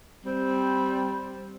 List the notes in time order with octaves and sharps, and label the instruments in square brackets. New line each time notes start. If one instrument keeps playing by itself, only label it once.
[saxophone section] G3 C4